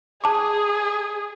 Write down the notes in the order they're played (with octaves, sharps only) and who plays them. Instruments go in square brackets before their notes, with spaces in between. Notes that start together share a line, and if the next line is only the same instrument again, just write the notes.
[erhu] G#4 [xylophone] A5 D6